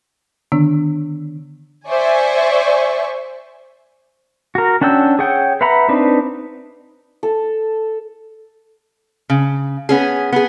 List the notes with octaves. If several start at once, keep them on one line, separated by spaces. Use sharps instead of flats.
D3 D#3 B3 D4
C5 D5 E5 G#5 C#6
F#4 A#4
C#4 D4 F#5 G5 E6
G#4 C#5 F#5 G5
B4 E5 F#5 A#5 B5
C4 D4 D#4 B4
A4
C#3
B3 C#4 G#4
B3 G#4